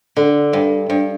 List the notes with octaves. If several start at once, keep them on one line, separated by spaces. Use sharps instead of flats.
D3
G2
G2